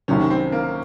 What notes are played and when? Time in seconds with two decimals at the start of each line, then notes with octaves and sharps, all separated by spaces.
0.08 C2 C3 D#3 F#3 C#4
0.30 C4
0.52 A#3